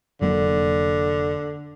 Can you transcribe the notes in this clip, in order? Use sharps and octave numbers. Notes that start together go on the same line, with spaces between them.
F1 D3 F#3 A#3